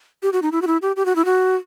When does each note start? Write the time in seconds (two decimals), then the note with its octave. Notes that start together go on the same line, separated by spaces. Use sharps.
0.23 G4
0.33 F#4
0.42 D#4
0.52 E4
0.62 F#4
0.67 E4
0.82 G4
0.96 G4
1.06 F#4
1.16 E4
1.25 F#4